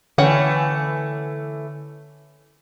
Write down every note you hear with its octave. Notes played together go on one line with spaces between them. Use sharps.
D3 E3 A3 C#4 F#5 G5